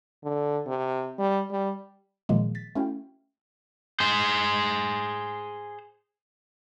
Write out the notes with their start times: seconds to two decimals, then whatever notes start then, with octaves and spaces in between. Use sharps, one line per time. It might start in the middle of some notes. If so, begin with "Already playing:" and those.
0.24 D3
0.67 C3
1.19 G3
1.51 G3
2.29 A#2 D#3 F3 F#3 G#3 A#3
2.55 A6 B6
2.75 A3 C#4 E4 F#4 F5 G5
4.00 G#4 C5